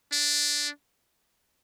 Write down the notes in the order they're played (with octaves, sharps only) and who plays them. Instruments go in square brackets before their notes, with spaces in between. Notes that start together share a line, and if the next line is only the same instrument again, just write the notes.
[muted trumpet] D4